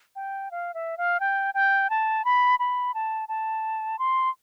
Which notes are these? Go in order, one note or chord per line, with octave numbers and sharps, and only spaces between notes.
G5
F5
E5
F5
G5
G5
A5
B5
B5
A5
A5
C6